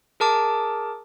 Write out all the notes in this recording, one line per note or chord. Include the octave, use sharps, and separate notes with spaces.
G#4 A#4 A5 D6